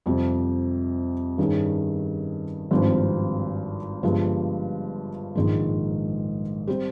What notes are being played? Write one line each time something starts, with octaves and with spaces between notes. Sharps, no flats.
F2 C3 G3
G2 D#3 G3 C#4 G#4
G#1 G2 F3 C4
G1 G2 F3 G#3
A#1 G#2 D#3 G#3
G3 C4 G4